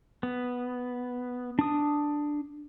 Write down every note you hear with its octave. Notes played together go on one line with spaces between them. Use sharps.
B3
D4 D#6